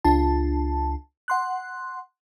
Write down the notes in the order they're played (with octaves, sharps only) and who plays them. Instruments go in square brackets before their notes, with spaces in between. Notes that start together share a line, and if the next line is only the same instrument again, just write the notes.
[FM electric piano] C#2 D4 F4 A5
F#5 C6 F#6